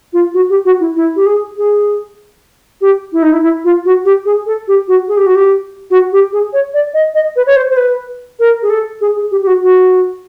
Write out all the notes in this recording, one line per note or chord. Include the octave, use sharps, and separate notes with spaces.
F4
F#4
G4
F#4
E4
E4
G4
G#4
G#4
G4
E4
D#4
E4
E4
F4
F#4
G4
G#4
A4
G4
F#4
G#4
G4
F#4
G4
F#4
G4
G#4
C#5
D5
D#5
D#5
B4
C#5
C5
C5
B4
A#4
G#4
A4
G#4
G#4
G4
G4
F#4
F#4